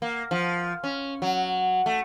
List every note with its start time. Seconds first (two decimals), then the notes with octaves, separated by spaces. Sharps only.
0.02 A#3
0.31 F3
0.84 C#4
1.22 F#3
1.86 A3